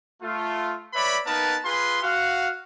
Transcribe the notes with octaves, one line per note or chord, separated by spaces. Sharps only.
A3 F4
B4 C#5 D5 E5 B5
A#3 B3 D#4 A#4 B4 A5
F4 G#4 B4 C6
F#4 F5 F#5